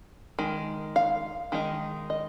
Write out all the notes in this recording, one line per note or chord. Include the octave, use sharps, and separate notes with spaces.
D#3 G#3
F5
D#3 G#3 D#4
D#5